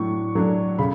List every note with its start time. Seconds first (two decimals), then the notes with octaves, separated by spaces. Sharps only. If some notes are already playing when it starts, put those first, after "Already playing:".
Already playing: A2 F#3 D4 C#6
0.35 F#3 A3 D4
0.79 C#3 B5